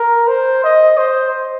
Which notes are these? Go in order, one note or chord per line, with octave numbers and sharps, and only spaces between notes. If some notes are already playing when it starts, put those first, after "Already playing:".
Already playing: A#4
C5
D#5
C5